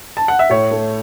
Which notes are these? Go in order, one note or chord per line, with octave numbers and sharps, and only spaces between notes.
A5
F#5
E5
A2 C#5
A3